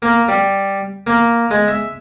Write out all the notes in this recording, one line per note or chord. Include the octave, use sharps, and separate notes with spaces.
A#3
G3
A#3
G#3
E5